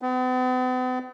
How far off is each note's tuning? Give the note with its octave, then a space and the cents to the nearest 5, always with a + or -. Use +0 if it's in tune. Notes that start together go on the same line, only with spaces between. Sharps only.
B3 +45